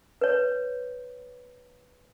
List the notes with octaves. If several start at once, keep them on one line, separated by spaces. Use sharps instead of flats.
B4 C#5